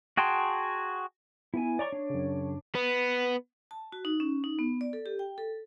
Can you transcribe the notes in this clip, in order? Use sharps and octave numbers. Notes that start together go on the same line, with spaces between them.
F#4 G#4 G5 A5 C6
B3 E4 G#5
C#5 D5 A#5 C#6
D4
F#2 C#3
B3
A5
F#4
D#4
C#4
D#4
B3
D5
A4
G4
G5
A4